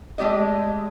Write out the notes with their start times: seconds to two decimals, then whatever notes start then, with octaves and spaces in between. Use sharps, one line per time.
0.18 G#3 A3 G4 D5 D#5